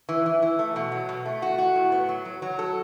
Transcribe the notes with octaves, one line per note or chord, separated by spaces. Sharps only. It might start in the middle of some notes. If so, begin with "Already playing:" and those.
E3
E3
E3
A3
B2
F#3
B2
A3
F#4
F#4
A2
B3
F#3
F#3
F#3
A4